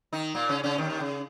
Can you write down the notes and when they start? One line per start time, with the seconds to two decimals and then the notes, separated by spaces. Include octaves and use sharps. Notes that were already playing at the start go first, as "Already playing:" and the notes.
0.13 D#3 D#4
0.35 A#2 A#3
0.49 C#3 C#4
0.63 C#3 C#4
0.78 D#2 D#3
0.90 D#3
1.00 C#3